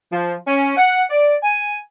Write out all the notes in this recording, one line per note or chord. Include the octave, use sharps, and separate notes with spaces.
F3
C#4
F#5
D5
G#5